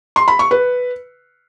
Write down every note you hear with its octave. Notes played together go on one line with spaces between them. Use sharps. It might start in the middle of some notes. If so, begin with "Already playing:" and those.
C6
B5
C#6
B4